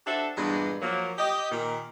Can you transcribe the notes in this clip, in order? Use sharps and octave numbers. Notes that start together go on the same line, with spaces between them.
D4 F#4 G4 A4 C5 E5
G2 A#2 E3 G#3 B3 D4
F3 F#3 A#3
G4 D#5
A#2 D#3 A#4